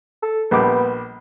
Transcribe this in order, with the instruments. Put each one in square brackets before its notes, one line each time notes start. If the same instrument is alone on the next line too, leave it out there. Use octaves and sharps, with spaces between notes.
[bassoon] A4
[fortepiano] A#1 G3 D6 [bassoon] B3